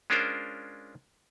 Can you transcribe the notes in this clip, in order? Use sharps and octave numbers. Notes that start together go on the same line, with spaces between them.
G#3 C#4 D4 F4 A#4 C5